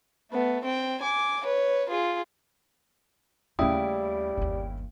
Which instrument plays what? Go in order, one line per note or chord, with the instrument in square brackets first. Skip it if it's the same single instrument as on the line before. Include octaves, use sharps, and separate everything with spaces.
[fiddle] A3 B3
C4 G5
G#5 D6
B4 C#5
F4 G#4
[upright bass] D#2 A3 [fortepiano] C#3 E4 D#6 [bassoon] G3 [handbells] G5
[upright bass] G1 D#2